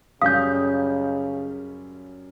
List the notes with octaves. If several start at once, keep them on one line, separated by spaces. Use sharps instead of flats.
F#2 C#3 G3 C#4 F5 D#6 G6